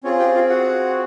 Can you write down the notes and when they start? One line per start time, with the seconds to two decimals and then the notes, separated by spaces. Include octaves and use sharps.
0.04 C4 C#4 F4 G#4 C#5
0.19 G4 G5
0.35 F4 F5
0.50 F#4 F#5